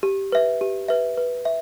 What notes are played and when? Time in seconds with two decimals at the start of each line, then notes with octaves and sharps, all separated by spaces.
0.03 G4
0.32 B4 E5
0.61 G4
0.88 B4 E5
1.17 B4
1.45 E5